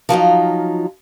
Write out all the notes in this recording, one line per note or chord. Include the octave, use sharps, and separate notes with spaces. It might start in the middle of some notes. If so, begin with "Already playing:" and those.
F3 F#3 D#4 F4